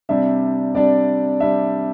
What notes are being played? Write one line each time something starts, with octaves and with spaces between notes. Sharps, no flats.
C3 G3 D4 E5
C3 G3 D4 D5
C3 G3 D4 E5